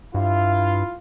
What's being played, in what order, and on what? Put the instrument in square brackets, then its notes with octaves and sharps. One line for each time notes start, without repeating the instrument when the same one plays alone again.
[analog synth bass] G2 [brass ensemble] E4 F4 F5